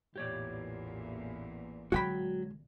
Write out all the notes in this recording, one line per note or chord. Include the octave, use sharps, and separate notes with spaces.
A1 E2 A#2 G4 C#5 D5
D3 F#3 G#3 F#4 G5 B5